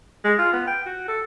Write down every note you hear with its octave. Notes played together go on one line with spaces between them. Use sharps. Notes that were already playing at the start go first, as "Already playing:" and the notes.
G#3
F4
B3
G5
F#4
A4